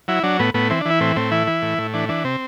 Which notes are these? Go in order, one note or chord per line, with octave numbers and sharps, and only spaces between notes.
F#3 E4
F#3 D4
A2 B3
A2 B3
E3 C4
D4
E3 E4
A2 C4
A2 C4
E3 E4
E3
A2
A2
E3 D4
E3 D4
C3 C4